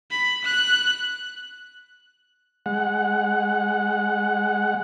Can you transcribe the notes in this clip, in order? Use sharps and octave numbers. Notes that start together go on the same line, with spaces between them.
B5
F#6
G#3 F#5